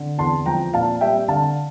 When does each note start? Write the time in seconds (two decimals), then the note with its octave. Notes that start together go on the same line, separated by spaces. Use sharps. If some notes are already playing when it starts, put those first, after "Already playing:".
Already playing: D3
0.18 E2 A5 C6
0.46 F3 G5 A#5
0.74 A#2 F5 A5
1.01 G3 E5 G5
1.28 D3 F5 A5